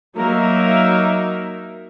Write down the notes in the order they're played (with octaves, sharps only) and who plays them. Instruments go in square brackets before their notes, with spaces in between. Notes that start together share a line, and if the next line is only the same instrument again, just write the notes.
[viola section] F#3 A#3 D#4 A#4 E5